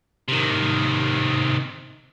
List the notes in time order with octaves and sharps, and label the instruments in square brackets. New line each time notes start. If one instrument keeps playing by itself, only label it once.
[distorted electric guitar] C3 D#3